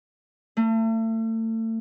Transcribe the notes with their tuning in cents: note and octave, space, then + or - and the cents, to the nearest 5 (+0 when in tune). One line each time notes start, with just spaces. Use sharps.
A3 +35